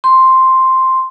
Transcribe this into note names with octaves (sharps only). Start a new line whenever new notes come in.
C6